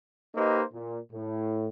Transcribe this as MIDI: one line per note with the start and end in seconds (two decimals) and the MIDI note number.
0.36 0.62 58
0.36 0.62 63
0.36 0.62 67
0.36 0.62 71
0.36 0.62 72
0.36 0.62 75
0.73 0.99 46
1.13 1.68 45